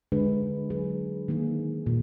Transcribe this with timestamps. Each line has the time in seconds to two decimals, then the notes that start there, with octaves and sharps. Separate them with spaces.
0.12 D3 G#3 D4 G#4 B4
0.70 F#3 D4 G#4 B4
1.28 D#3 A#3 D#4 G#4
1.86 A#2